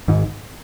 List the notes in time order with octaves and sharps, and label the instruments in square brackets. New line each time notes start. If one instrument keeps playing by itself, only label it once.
[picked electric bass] G#1 G#2